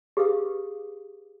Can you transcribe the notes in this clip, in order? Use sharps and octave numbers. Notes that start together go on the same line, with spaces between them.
G4 G#4 B4 F5 D#6